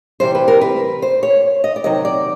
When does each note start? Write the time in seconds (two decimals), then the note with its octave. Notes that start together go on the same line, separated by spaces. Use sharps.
0.20 C3 E3 G3 C5
0.35 B4
0.48 A#4
0.61 B4
1.02 C5
1.23 C#5
1.64 D#5
1.76 D5
1.84 C3 D#3 F#3 D#5
2.05 D5